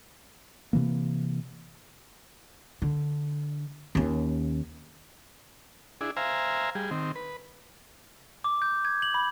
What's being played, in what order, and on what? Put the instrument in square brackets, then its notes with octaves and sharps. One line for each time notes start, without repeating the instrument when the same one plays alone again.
[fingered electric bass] C3 E3 A#3
[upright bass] D3
D#2 C#4
[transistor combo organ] D4 E4 G#4
C5 E5 F5 G#5 A#5
G3 G#4
D#3 C4
B4
[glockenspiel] D6
G6
G#6
F#7
B5